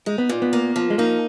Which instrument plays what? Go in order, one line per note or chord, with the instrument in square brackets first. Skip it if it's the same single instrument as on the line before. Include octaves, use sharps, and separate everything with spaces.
[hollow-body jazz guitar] G#3 [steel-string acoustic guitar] D#4
[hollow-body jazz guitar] B3
[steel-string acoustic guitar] A#2
[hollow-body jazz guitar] B3
[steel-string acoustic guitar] A#3
F3
[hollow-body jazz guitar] G#3
[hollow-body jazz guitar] A#3 [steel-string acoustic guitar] D#4